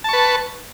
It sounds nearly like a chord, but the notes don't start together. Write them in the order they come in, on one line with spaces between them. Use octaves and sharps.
A5 C#6 B4